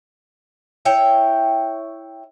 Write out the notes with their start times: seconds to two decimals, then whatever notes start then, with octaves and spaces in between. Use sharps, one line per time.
0.85 E4 C#5 G5